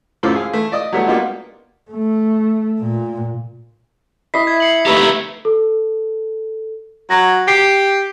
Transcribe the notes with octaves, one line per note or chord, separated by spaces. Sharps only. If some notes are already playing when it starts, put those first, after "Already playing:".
F#2 A2 F4 A4 C5 D6
G#4 F5
A3
D5 D#5 D#6
F#3 G3 A3 B3
G3 A#3 B3 D#4 F4
A3
A#2
E4 D#5 B6 C7
G#6
C7 C#7 F#7
A3 D#4 G4 B4 E5 A#5
A4
F#3 A#6
G4 C7